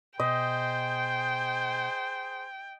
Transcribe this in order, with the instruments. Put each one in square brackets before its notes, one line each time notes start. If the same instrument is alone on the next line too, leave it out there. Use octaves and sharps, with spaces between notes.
[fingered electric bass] B2 [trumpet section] G#4 C5 [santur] D#5 [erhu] G5